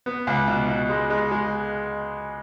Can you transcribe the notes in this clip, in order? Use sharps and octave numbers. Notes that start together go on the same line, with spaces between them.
B3
C#2
B2
B2
G#3
G#3
G#3